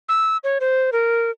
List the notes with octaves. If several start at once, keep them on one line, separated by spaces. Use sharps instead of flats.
E6
C#5
C5
A#4